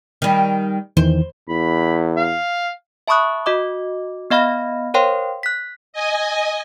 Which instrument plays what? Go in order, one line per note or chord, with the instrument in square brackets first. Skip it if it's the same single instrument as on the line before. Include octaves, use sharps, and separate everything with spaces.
[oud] D#3 G3
[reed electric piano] E2 D#3 E3 [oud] C5
[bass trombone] E2 [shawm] B5
[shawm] F5
[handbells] E5 A5 B5 C#6 D#6 F#6
F#4 D#5 D6
B3 D#5 F5 B5 F6 A#6
A#4 C5 C#5 F5 G5 C6
F#6 B6
[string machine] D#5 G#5